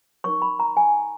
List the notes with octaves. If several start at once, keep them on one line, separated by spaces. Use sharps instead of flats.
D#4 A#4 C#5 C#6
B5
A#5
G#5